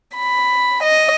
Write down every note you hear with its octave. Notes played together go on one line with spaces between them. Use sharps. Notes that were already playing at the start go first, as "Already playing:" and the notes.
B5
D#5